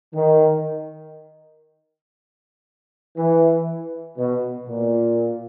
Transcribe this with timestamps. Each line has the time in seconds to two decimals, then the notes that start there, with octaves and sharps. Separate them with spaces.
0.14 D#3
3.17 E3
4.18 B2
4.68 A#2